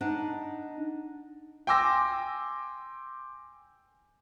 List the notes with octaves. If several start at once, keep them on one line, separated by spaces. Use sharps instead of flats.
D4 D#4 F#5
G5 G#5 C6 D6 E6 A#6